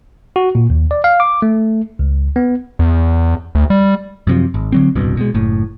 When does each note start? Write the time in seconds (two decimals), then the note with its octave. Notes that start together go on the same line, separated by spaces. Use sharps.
0.36 F#4
0.55 A#2
0.70 D#2
0.91 D5
1.04 F5
1.20 D6
1.42 A3
1.99 C#2
2.36 B3
2.79 E2
3.55 D2
3.70 G3
4.27 F#2 C3 F3
4.54 G#1
4.72 D3 F#3 C4
4.95 D#1 C2 G2 B2
5.17 B2 G#3
5.34 F#1 A2